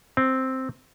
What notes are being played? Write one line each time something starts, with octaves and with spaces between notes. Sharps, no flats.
C4